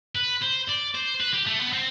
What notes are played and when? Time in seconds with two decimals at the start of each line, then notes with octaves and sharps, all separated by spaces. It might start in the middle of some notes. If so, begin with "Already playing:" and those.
0.15 B4
0.42 C5
0.68 D5
0.95 C5
1.21 B4
1.34 G4
1.47 A3
1.59 B3
1.73 C4